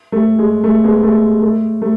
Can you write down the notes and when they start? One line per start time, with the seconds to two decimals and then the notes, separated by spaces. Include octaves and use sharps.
0.12 A3
0.38 G#3
0.64 A3
0.84 G#3 B3
1.03 A3
1.42 A3
1.82 A3